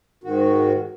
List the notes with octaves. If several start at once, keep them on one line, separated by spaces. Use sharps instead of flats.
G#2 D#3 F#4